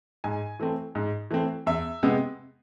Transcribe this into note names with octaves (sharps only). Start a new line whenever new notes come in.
G#2 G#5
E3 A3 C4
G#2
E3 A3 C4
E2 E5
C3 G#3 B3